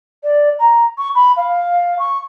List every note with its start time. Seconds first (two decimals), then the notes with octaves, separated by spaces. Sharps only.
0.23 D5
0.59 A#5
0.98 C#6
1.15 B5
1.37 F5
1.99 C#6